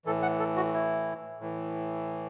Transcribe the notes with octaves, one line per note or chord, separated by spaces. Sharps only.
A2 E3 A4
F#5
A4
F#4
E4
A2 E3